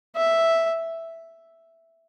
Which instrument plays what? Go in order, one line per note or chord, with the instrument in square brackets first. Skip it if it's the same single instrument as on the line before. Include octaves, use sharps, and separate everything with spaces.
[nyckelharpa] E5